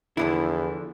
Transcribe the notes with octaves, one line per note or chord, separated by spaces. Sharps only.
E2 D3 E3 F3 E4